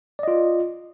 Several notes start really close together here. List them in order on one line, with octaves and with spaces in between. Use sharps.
D5 D#5 F4